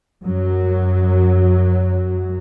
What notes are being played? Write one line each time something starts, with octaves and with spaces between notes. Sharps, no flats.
F#2 F#3